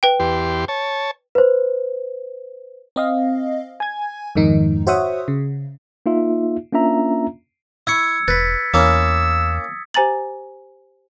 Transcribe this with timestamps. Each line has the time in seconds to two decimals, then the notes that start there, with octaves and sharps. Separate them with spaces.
0.03 B4 G5
0.20 E2 G4 C6
0.68 C#5 A5
1.35 B4 C5
2.96 C4 D#5 F5
3.80 G#5 G#6
4.35 F2 G#2 D#3 D#4
4.87 F#4 C5 C#5 E5 F#5 D#6
5.28 C#3
6.06 A#3 D#4 F4 E5
6.73 A#3 C#4 D4 F4 E5 A#5
7.87 E4 C#6 E6 G#6 C#7
8.28 E1 B4 A6 B6
8.74 E2 A#3 C#4 E4 D#6 E6
9.94 G4 C5 G#5 A#5 A6 F#7